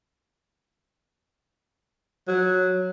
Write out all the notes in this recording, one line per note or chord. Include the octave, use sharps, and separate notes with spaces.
F#3